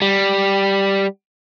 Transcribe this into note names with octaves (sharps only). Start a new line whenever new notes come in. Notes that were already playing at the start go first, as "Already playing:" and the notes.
G3